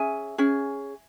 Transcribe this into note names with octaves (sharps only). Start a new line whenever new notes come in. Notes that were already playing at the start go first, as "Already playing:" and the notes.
Already playing: C#4 G#4 E5 G#5
C#4 G#4